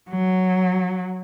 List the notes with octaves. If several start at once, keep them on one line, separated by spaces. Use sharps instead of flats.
F#3